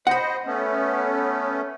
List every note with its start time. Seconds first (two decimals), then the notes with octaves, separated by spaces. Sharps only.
0.07 C5 D#5 F#5 B5
0.46 A3 B3 C#4